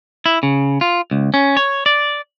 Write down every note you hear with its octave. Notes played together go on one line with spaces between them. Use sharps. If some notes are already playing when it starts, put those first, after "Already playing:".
E4
C#3
F4
C#2
C#4
C#5
D5